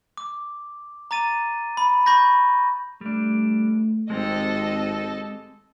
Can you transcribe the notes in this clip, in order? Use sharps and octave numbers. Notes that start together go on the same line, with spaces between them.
D6
A#5 D6 A6 D#7
B5
B5 C#6 G6 A#6
G3 A3 D4
G#1 G#3 C4 G4 A4 D#5